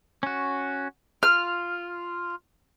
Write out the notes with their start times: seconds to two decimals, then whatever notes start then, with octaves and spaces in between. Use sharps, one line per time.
0.23 C#4 F#4
1.23 F4 F6